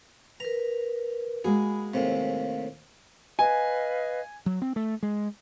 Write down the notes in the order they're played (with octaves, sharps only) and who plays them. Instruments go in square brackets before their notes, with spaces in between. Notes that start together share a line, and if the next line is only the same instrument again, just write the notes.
[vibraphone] A#4 B4 [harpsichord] A#5
[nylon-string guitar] G#3 A#3 F#4 [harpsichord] G#4 [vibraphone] B5
[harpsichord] D#2 A2 C3 [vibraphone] F5
[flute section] B4 D#5 F5 [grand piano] G#5
[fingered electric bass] F#3
C4
A3
G#3